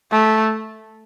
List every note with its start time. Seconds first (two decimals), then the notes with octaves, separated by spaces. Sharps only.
0.11 A3